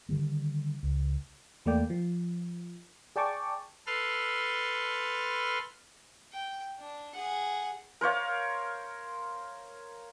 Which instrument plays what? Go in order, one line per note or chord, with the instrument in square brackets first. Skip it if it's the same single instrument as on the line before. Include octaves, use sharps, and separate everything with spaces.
[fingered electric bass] D3 D#3 G3
C#2
[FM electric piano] E2 A3 A#3 D5 G5
F3
G#4 D5 G5 A5 C#6 D6
[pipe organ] A4 B4 C6 F6
[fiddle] G5
D4
G#4 F#5
[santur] A#4 C5 C#5 F5